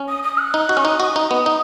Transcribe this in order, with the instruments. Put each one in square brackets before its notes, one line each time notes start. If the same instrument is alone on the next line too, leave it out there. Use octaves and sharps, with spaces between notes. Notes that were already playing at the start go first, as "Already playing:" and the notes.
Already playing: [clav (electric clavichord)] C#4
[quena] D#6
D#6
F#6
[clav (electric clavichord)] D#4
F#4
[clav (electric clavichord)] C#4 [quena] C#6
[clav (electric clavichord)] D#4 [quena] D#6
[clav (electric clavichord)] F#4 [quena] D#6
[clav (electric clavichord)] D#4
B3
D#4